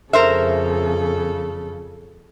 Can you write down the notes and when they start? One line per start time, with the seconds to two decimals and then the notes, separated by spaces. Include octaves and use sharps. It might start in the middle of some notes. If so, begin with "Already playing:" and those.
0.13 F2 C#3 A4 A#4 C5 E5